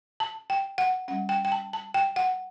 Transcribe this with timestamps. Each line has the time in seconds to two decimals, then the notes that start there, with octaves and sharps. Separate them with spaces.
0.20 A5
0.50 G5
0.78 F#5
1.08 C#4 F#5
1.11 G3
1.29 G5
1.45 G5
1.52 A5
1.73 A5
1.94 G5
2.16 F#5